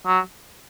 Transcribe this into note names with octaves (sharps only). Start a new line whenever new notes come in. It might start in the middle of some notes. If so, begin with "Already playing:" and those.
F#3